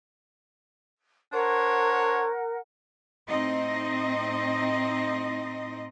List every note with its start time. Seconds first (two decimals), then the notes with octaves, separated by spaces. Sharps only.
1.32 D4 A#4 C5 C#5 F#5
3.27 A2 C4 D#4 D#5